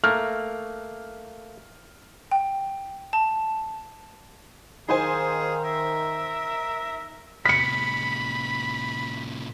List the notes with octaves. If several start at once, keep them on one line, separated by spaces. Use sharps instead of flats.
A3 A#3 F6
G5
A5
D#3 D#4 G#4 C5 F5 G#5
A#4 E5
A2 C3 B5 B6 C#7